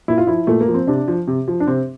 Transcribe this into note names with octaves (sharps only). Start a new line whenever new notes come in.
A#2 E4
F4
F3 E4
A#2 A3
A#3
F3
C4
C3 D4
F3
C3
F3
D4
C3 C4